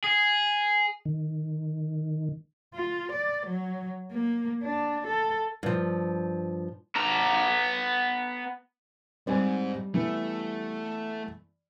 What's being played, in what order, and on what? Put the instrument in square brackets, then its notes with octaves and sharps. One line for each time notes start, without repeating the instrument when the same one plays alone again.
[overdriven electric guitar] G#4
[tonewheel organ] D#3
[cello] F4
D5
F#3
A#3
D4
A4
[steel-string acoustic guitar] G2 F3
[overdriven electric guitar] B3 A#5
[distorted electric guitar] G#2 [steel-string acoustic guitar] G3 [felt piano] C4 D5 G#5
[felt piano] E3 B3 [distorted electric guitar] A3